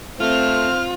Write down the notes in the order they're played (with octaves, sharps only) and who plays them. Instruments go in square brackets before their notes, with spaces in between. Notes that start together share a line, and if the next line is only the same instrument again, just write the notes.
[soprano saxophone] A3 [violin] C4 [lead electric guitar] F4 [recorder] F6